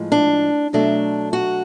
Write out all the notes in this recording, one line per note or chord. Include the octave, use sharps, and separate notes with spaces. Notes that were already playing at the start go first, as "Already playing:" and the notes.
Already playing: A2 F3 G#3
D4
B2 F#3 A3 D4
F#4